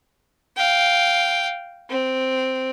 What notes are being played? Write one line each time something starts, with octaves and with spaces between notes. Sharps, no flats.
F5 G5
C4